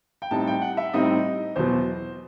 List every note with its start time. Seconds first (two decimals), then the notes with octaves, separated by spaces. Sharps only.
0.22 G5
0.31 A2 G3 C4 D#4 A5
0.47 G5
0.62 F#5
0.77 E5
0.93 A2 G3 C4 D#4 D#5
1.56 E2 B2 F#3 C5